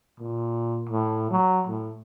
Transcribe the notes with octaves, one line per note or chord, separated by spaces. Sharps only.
A#2
A2
F#3
A2